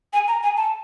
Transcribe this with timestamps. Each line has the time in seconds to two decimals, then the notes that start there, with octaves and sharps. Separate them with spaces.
0.13 G#5
0.28 A#5
0.43 G#5
0.57 A5